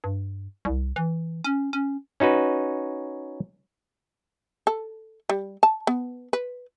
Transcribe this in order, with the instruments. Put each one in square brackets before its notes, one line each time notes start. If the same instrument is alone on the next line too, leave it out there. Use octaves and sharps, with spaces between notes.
[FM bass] G2
C2
E3
C#4
C#4
[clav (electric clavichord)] C#4 D#4 F#4 B4
[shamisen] A4
G3
A5
B3
B4